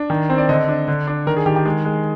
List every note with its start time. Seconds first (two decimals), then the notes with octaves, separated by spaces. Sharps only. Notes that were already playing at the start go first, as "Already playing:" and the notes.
Already playing: D4
0.10 D#3
0.30 C4
0.38 D5
0.49 D3 D#5
0.69 D4
0.88 D3
1.07 D4
1.27 D#3 A#4
1.37 G#4
1.46 D#3 G4
1.56 G4
1.65 G#3 G#4
1.85 G#3